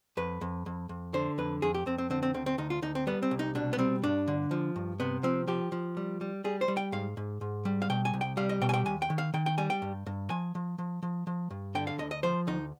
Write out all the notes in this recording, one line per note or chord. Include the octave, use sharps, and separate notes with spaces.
F2 B4
F2
F2
F2
D3 C5
F2 B4
F2 G#4
G4
F2 C4
C4
D3 C4
C4
D2 C4
C4
D2 D#4
F4
D2 D#4
C4
G3 B3
C4
C2
D#4
B2 D4
B3
G3 C4
G2 D4
D3
F3
G2
C3 B3
F3 C4
F3 G4
F3
G3
G3
G3 G#4
C5
G3
G5
G#2 F5
G#2
G#2
G3
F5
B2 G5
G#5
C2
G5
G3 F5
D#5
B2 G5
G#5
G5
D#2 G#5
G5
D#3
F5
D#3 G5
G5
G3 G#5
G5
G2
G2
F3 G#5
F3
F3
F3
F3
G2
D3 G5
F5
D2 D#5
D#5
F3 C5
D2 D#4